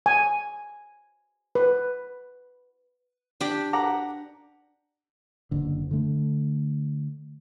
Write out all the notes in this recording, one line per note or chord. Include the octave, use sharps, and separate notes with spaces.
G#5
B4
D4 G4
F#5 A#5 D6
F#1 D3
D3 A3